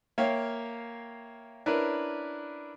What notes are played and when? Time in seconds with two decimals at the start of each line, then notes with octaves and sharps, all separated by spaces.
0.18 A#3 C#5 E5 F5 G5
1.66 C#4 D4 E4 A#4 B4